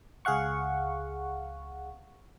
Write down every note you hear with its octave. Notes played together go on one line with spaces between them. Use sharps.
C#2 G#4 F5 F#5 C#6